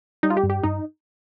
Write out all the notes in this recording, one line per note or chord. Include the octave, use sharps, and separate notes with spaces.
G3 D#4
F4
G4
G2
G4
G2 D#4